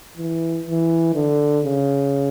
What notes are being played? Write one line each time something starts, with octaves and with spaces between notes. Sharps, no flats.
E3
E3
D3
C#3